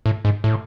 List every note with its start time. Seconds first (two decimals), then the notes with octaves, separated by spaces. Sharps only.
0.06 A2
0.25 G#2
0.44 A2